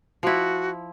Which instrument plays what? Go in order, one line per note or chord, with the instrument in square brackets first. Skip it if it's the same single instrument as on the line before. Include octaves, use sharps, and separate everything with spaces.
[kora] F3 E4 [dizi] F#4